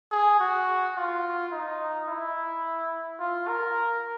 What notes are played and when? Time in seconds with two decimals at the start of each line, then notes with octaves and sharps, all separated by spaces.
0.12 G#4
0.40 F#4
0.96 F4
1.52 D#4
2.08 E4
3.20 F4
3.48 A#4